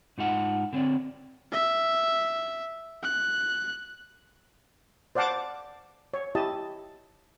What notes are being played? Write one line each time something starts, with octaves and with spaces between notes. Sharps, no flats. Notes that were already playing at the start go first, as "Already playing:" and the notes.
G#2 D#4 F4 F#5 A5
D3 C4 C#5 D5
E5
F#6
C5 D5 F5 F#5 A5 D6
C#5
E4 G4 D#5 A5